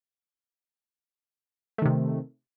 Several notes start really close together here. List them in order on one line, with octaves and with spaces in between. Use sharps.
A3 D#3 C3